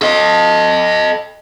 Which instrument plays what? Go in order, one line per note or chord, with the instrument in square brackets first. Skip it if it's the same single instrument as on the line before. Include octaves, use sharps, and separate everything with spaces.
[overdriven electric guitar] A4 D#5